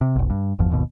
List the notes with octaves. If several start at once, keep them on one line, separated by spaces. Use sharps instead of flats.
C3
F1 B1
G2
G1 E2 F3
G#1 D#2 B2